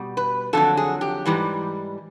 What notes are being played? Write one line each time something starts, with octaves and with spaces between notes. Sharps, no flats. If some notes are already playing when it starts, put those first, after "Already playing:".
Already playing: B2 G3
B4
F2 D3 F#3 A4
G#4
G4
G#2 E3 G3